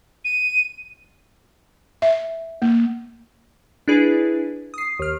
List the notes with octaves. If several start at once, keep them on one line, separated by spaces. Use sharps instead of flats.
D#7
E5
A#3
D4 E4 G#4 B4
D#6 C7
D#2 F6